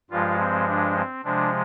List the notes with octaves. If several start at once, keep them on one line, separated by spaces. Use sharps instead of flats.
G2 F3 G#3 F4
C4
D4
C4
C3 F3 G#3 D4